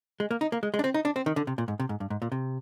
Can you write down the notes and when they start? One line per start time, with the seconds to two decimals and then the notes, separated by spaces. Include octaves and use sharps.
0.20 G#3
0.31 A#3
0.41 D#4
0.52 A#3
0.63 G#3
0.74 G#3
0.79 D4
0.84 C4
0.94 D#4
1.05 D4
1.16 C4
1.26 D#3
1.36 D3
1.47 C3
1.58 A#2
1.68 G#2
1.80 C3
1.89 G#2
2.00 G2
2.10 G#2
2.22 A#2
2.32 C3